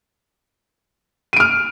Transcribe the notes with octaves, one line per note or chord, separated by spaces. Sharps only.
F6 D7 D#7